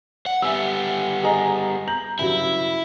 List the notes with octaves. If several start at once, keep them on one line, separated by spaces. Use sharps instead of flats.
F#5
G3 B3 E5 G#5 E6
G#4 D#5 A#5
A#5 G6 F#7
G2 C#3 F#3 E4